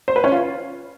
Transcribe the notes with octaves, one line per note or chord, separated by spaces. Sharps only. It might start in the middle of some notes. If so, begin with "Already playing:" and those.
C5
B4
C#4
F4